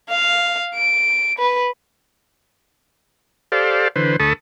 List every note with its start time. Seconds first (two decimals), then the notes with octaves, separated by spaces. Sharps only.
0.10 F5
0.75 D7
1.39 B4
3.52 G4 A4 C5 D5 F5
3.96 D3 E3 B4 C5
4.19 D2 A4 A5 B5 C#6 D#6